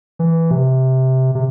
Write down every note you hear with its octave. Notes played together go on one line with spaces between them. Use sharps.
E3
C3
C3